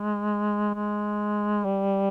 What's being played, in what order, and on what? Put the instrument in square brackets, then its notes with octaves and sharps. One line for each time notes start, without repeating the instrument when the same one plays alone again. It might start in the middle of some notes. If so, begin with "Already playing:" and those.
Already playing: [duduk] G#3
G#3
G3